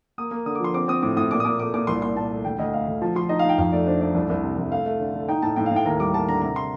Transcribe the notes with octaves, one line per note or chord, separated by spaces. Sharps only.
A#3 D#6
A#3
D3 D#6
D6
F3 C6
C4 D6
C4 D#6
A2 D6
A2 D#6
A#2 D6
D#6
A#2 D6
A3 D6
A#2 D6
C2 C6
A#2 C6
A#2 A5
A3
D2 G5
D2 D#5
A3 F5
D2
F3 A5
F3 C6
D#4 D#5
F5
D#4
G5
F2 F5
A3 D5
D4 C5
A3 D5
C2
C2
C3
C2
A3 F5
A3
D3
D3
D#4 G5
A2 A5
A2 G5
F5
A2 G5
D#2 A#5
G3 D6
D#2 A5
D3 A#5
C3 A#5
C6